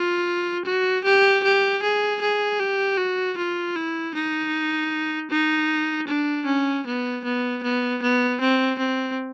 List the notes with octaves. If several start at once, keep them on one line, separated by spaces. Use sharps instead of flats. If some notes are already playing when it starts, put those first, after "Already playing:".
Already playing: F4
F#4
G4
G4
G#4
G#4
G4
F#4
F4
E4
D#4
D#4
D4
C#4
B3
B3
B3
B3
C4
C4